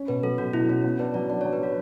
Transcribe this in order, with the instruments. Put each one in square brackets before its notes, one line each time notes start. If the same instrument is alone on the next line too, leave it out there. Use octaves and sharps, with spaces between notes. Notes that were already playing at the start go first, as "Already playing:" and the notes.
Already playing: [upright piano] C#4
[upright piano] B2 [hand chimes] B4
[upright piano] F#3 [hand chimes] A4
[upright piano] B2 [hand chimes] F#4
[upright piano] B2 [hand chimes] E4
[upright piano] C#4 [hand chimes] F#4
[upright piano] B3
[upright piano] D4 [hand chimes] B4
[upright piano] F#3 [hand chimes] D5
[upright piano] D4 [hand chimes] D5
[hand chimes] C#5
[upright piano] F#3
[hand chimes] B4
[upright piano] F#3 [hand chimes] F#4